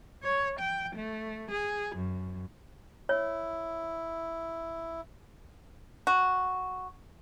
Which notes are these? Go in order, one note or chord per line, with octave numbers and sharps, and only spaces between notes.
C#5
G5
A3
G#4
F#2
E4 C#5
F#4